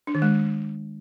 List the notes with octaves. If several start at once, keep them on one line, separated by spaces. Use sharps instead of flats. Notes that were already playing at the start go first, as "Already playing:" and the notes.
D4
D#3
G#3